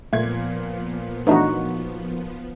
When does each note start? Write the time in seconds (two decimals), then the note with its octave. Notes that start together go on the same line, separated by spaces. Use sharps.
0.13 A#2 F3 A3 B3 G#6
1.27 E3 A3 D4 D#4 F#4